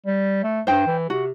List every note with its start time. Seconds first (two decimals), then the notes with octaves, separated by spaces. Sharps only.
0.06 G3
0.43 A3
0.67 G2 C5 G5
0.87 E3
1.10 C3 F#4